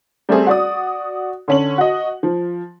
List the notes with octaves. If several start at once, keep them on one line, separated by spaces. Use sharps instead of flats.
G3 A3 C4 G#4
F#4 D5 D#6
D3 C#4 F#7
F#4 D#5
F3